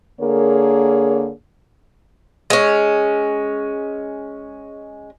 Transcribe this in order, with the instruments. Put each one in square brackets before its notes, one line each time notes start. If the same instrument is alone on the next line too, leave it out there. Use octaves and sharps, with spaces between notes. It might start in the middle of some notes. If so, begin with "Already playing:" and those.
[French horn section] D3 A#3 G#4 A#4 C#5
[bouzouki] G#3 C#4